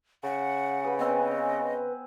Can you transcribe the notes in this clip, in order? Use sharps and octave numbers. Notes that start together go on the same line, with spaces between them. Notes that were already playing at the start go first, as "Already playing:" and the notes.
C#3 F#5
G#4 B4 B5
B3 C4 D#5